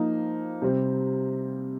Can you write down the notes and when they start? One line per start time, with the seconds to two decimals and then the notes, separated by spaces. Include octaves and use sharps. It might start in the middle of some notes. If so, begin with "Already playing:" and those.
Already playing: F3 A#3 D#4
0.62 C3 G3 C4